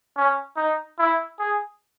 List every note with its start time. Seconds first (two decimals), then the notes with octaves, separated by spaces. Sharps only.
0.16 C#4
0.57 D#4
0.99 E4
1.39 G#4